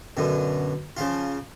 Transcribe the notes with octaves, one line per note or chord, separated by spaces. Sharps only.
F#2 B2 D3
C#3 F3 F4